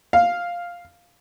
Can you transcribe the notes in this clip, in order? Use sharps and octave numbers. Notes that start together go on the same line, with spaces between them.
F5